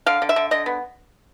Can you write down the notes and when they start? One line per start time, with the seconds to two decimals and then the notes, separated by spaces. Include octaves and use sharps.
0.06 D3 F5
0.22 D3
0.29 E5
0.36 D3
0.51 D3 D#5
0.66 B3